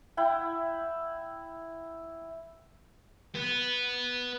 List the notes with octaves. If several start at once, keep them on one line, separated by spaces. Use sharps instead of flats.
E4 F#5 G5
B3